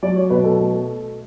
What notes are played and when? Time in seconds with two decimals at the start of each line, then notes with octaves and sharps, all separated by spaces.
0.03 F#3 D5
0.16 C#5
0.30 B2 B4
0.44 A4
0.57 A3